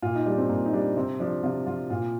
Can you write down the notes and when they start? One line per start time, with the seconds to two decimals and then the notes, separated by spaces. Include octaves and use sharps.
0.02 A#2 F4
0.15 D#4
0.26 G3 D4
0.38 C4
0.49 A#2 A#3
0.65 D#4
0.73 G3 D4
0.96 C3 C4
1.20 F3 D4
1.43 C3 F4
1.66 F3 F4
1.90 A#2 F4